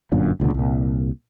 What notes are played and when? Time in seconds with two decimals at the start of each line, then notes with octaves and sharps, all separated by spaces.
0.12 G1 F#2 A#2 D3
0.40 E1 C#2 A#2 D3
0.54 C2 A#2